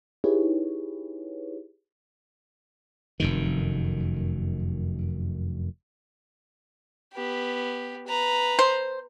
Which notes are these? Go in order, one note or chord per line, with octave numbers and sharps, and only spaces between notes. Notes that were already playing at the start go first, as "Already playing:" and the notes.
D#4 E4 G4 G#4 B4 C#5
F1 F#2 D#3
B3 G4
B4 A#5
C5